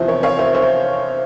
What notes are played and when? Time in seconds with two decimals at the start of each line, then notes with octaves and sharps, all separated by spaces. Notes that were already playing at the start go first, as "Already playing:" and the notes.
Already playing: E2 C3 F3 C5 E5
0.08 A#4 C#5
0.23 C#5 F5
0.38 C5 E5
0.54 C5 E5